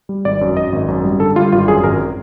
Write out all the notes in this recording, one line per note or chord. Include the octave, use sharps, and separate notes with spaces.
G3
G#1 D5
F#2
F#2 D#5
G#1
F#2
G3
D3 A4
G3 F4
G#1 F4
F#2 G#4
G#1 A#4